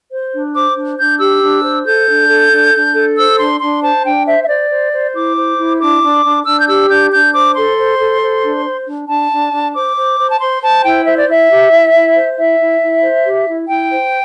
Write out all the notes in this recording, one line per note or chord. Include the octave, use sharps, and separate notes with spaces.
C5
D4
C5 D6
D4
D4 G6
G4 E6
D4
C5
A4 G6
D4
A4
D4
D4
A4
C5 E6
D4 C6
D4 C6
C5 A5
D4 G5
C5 E5
E5
C5 D5
C5
C5
E4 D6
C5
E4
D4 D6
D4
D4
D4 E6
G6
G4 E6
D4 G6
D4 G6
C5 D6
A4 C6
C5
A4
C5
D4
C5
D4
D4 A5
D4
D4
C5 D6
C5
C5
A5
C5 C6
C5 A5
E4 G5
C5 E5
D5
E4 E5
G4
E4
E4
C5
E4 E5
E4
E4
C5
G4
E4
E4 G5
C5